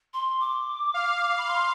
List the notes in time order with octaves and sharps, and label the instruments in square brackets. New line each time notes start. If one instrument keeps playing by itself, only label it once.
[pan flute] C6
D6
[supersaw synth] F5
[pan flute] B5
C6